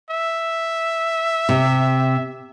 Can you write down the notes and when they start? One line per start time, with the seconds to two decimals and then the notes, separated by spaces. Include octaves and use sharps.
0.10 E5
1.49 C3